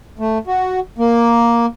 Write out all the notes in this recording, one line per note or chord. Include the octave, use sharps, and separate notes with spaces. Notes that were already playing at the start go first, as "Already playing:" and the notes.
A3
F#4
A#3